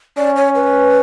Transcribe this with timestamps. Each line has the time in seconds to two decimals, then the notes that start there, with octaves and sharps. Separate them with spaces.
0.17 C#4 D5
0.36 C#5
0.55 B4